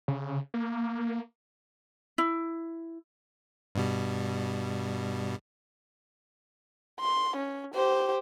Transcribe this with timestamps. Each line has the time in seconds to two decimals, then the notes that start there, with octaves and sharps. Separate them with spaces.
0.08 C#3
0.54 A#3
2.18 E4
3.75 G2 B2 G3
7.00 C6
7.37 C#4
7.74 G4 C5